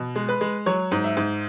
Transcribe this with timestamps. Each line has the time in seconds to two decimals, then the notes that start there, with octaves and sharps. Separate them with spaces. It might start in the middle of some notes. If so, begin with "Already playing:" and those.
Already playing: B2
0.16 G#3
0.29 B4
0.41 G#3
0.66 F#3 C#5
0.91 G#2
1.04 E5
1.17 G#2